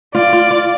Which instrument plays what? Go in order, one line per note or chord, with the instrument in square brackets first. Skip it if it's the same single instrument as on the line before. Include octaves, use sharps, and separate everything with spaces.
[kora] F4 [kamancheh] D5
[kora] F4
F4